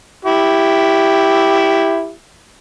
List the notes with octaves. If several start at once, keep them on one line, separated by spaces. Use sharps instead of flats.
E4 G4